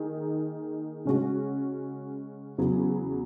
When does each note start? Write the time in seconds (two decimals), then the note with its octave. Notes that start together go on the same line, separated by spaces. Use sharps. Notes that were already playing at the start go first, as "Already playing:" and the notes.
Already playing: D#3 A#3 D#4 G#4
1.05 C#3 G#3 C#4 F#4
2.58 E2 C#3 F#3 B3